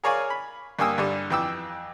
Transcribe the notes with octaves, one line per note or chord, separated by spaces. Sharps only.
G#4 A#4 C#5 D5 F5 G#5
B5
G2 A#3 G5 G#5 D#6 E6
G2 D3 G3
F2 E3 G5 D6 E6